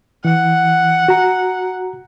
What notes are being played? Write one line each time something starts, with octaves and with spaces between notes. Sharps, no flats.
E3 F#5
F#4 A#5